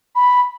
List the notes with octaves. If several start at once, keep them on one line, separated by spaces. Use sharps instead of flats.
B5